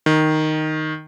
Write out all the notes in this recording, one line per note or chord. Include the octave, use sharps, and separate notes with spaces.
D#3